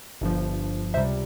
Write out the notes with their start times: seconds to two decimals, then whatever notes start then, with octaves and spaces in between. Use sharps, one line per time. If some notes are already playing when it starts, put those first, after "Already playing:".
0.21 G1 G2 F3
0.94 C#2 C3 G3 C5 E5